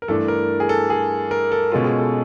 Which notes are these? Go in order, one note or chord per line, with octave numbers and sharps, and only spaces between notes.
A#4
G2 E3 A3 D4 A4
A#4
G#4
A4
G#4
A#4
A4
B2 G#3 C#4 F4 A4
G#4
A4